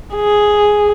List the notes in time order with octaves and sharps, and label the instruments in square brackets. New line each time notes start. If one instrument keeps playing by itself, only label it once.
[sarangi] G#4